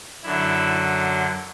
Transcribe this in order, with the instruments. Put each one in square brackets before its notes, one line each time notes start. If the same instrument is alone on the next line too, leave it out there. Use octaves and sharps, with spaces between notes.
[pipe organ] F#2 D3 F#3 E4